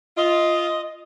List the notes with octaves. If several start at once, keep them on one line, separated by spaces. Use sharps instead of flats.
F4 D#5